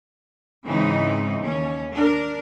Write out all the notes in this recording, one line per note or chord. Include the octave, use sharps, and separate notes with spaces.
G#2 C#3 E3 C4 D#4
D#2 C#4
D4 A#4